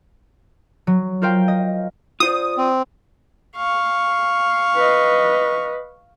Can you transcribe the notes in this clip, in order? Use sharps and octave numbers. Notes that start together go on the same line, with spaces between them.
F#3
F4 A#4 C5 F5 G5
D#5
F4 C5 D5 D#6
C4
F5 C#6
B4 D#5